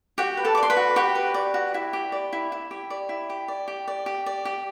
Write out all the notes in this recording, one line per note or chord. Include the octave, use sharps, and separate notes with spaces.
F#4 G4 G5
B4
A4 A5
D6
D5
C6
B4 B5
F#4
F#4 G4 G5
B4
D5
F#4
E4
G4
D5
E4
E4
G4
D5
E4
G4
D5
G4
D5
G4
D5
G4